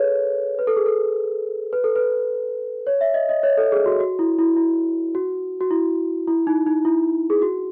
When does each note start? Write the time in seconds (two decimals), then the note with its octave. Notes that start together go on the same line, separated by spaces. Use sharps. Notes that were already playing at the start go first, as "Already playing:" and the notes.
Already playing: G#4 A4 B4 C#5
0.59 B4
0.67 A4
0.77 G#4
0.86 A4
1.73 B4
1.84 A4
1.95 B4
2.87 C#5
3.01 E5
3.14 D#5
3.29 D#5
3.43 C#5
3.57 A4
3.72 G#4
3.86 F#4
4.00 F#4
4.19 E4
4.39 E4
4.57 E4
5.15 F#4
5.61 F#4
5.71 E4
6.28 E4
6.47 D#4
6.66 D#4
6.85 E4
7.30 G#4
7.42 F#4